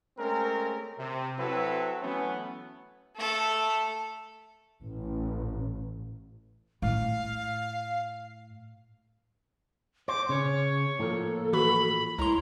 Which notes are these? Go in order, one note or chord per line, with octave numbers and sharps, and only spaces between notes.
G#3 A3 C4 C#4 A#4
C3
F#3 C4 E4 F#4 A4 B4
E3 F#3 A3 B3 C#4
A3 A4
A1
A2 F5
C5 D6
C#3 C#5
A2 F3 A#3 A4
E3 F#4 B5
C#2 E4 A#5 C6